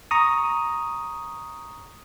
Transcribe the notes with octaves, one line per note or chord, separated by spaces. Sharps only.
A#5 C#6 D#6